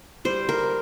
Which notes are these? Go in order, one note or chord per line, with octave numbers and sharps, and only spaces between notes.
G3 C5
A#4